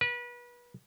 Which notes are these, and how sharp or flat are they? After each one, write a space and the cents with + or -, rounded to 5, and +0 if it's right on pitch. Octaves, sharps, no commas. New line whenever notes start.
B4 -30